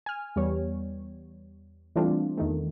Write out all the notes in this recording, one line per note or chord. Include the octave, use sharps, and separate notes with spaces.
G#5 F6
E2 G3 B3 C#5
E3 G3 A3 C4 D4 F4
E2 D#3 A3